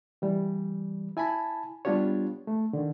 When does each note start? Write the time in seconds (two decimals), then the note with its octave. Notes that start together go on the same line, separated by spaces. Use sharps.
0.22 E3 G3
1.17 E4 G#5 A5 B5
1.85 G3 B3 D4 F4 G4 C#5
2.47 A3
2.73 D3 D#3